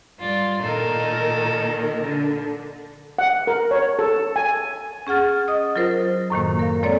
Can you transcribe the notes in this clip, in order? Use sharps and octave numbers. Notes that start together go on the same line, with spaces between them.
G2 F4 D5
A#2 D#3 D#4 A4 A#4
D3
F#5
A#4
C#5
A4
G#5
C#4 G#4 F#5 F6 A6
D#5 D#6
F#3 F4 A#4 C5
F#2 A2 D#3 A#3
A#4 F5
G#3 A#3 C4 A4 C#5 D5